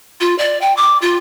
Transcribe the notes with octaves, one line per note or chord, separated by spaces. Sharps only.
F4
D5
G5
D6
F4